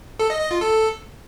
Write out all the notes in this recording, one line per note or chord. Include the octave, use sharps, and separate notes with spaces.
A4
D#5
D#5
F4
A4